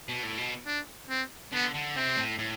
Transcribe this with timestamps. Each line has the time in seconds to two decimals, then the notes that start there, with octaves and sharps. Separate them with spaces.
0.09 B2
0.23 A2
0.38 B2
0.66 D4
1.09 C4
1.52 D3 B3
1.74 D3
1.96 C3 C4
2.18 A2
2.39 A2